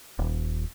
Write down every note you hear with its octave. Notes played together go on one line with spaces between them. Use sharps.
D#1